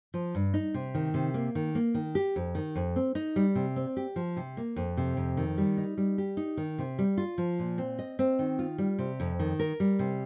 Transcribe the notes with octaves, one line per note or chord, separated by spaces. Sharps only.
F3
G2
D#4
C3
D#3
C3
A#3
D#3
A#3
D#3
G4
F2
D#3
F2
C4
D#4
G3
C3
C4
G4
F3
C3
A#3
F2
C3
F2
D#3
G3
D#4
G3
G4
D#4
D#3
C3
G3
F4
F3
A#2
C4
D#5
C4
D#3
F4
G3
C3
F2
D#3
A#4
G3
C3